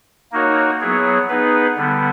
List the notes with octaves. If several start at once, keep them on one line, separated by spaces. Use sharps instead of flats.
A#3 D#4 F#4 A#4 C#5
F#3 B3 E4 G#4 C#5
B3 D#4 G#4 B4
D3 G3 B3